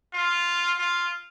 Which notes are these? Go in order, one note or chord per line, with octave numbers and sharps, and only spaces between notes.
F4
F4